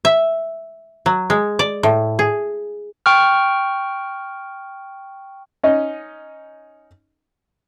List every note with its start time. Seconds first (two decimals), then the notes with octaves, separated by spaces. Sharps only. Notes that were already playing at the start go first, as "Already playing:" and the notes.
0.05 E5
1.06 F#3
1.30 G#3
1.59 D5
1.83 A2
2.19 G#4
3.06 G5 C#6 F6
5.63 C#4 D#4 D#5